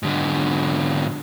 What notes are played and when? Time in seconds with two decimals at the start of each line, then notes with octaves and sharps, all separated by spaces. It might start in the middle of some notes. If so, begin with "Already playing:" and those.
0.03 G#2 D3